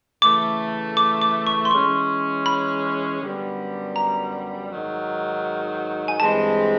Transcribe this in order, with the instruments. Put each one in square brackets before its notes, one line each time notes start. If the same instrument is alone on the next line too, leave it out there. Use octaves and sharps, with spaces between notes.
[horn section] C#3 E3 A3 [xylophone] D6
[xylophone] D6
D6
C#6
C6
[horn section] E3 G#3 C#4 [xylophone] C#6
[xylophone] B5
[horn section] F#2 D3 G3 B3
[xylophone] A#5
[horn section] G#2 D#3 F#3
[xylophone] G#5
[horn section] G2 E3 G#3 C4 [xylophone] A5